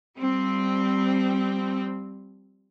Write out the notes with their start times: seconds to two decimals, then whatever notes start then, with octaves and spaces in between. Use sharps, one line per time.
0.18 F3 G3 C4